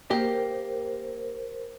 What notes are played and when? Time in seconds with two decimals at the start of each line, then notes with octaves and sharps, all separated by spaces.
0.11 A#3 G4 A#4 C5 G5